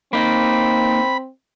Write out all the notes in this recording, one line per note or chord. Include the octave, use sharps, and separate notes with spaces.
A#3 C4 D#4 B5